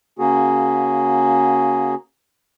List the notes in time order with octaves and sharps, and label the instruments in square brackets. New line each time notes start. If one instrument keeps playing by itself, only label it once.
[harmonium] C#3 A#3 C#4 F#4 G#4